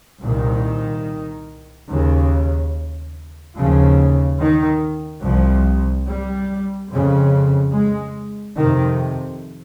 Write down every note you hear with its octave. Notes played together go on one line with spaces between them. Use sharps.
C2 A#2 D#3
D#2 C#3
D#2 C#3 F3
D#3
C2 C3 F3
G3
F2 C#3
G#3
F2 C3 D#3